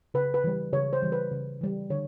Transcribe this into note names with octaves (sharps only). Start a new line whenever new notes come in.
C#3 B4
B4
E3 G3
C#3 C#5
C5
E3 G3
B4
C#3
E3 G3
D3 C#5